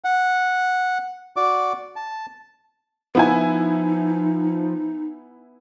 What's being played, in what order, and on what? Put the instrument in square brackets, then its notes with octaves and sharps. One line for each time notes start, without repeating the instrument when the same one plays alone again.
[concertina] F#5
F#4 D5 D6
A5
[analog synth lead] F3 [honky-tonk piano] B3 E4 G#5 [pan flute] D#4